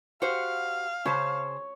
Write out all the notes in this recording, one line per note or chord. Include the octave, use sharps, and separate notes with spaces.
F#4 G4 C5 F5
C#3 C5 C#5 A5